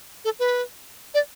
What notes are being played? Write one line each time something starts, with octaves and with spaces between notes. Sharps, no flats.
A4
B4
D5